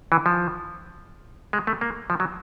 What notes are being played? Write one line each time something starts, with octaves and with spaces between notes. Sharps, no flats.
E3
F3
G#3
A3
A#3
F3
F#3